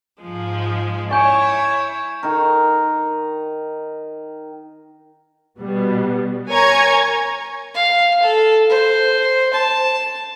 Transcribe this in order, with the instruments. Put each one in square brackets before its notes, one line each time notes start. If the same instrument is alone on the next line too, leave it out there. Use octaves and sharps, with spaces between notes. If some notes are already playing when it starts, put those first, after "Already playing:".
[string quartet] G#2 F3 G#3
[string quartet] E4 [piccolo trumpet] C#5 [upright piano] G#5 [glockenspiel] C#6 G6 D7
[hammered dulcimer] D#3 A#4
[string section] B2 G3 B3
A#4 C#5 G#5 A#5 C#6 G#6
[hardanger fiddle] F5
A4
C5
A5